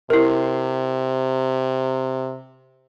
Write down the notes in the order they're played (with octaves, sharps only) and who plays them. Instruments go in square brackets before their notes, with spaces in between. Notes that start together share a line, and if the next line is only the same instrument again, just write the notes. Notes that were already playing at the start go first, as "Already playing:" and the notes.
[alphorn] C3 [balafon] E4 A#4